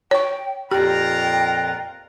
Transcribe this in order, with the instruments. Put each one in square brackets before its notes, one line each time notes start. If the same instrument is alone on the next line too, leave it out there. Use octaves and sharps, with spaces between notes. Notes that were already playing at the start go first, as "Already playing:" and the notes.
[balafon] C#5 C#6 [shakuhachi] G5
[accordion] F2 A#2 F#6 [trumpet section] F4 A#5 [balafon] G4 [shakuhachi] G5